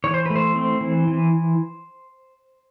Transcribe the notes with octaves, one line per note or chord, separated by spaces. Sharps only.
E3 C#5
C5
A3 B4
C5
C4
E3
E3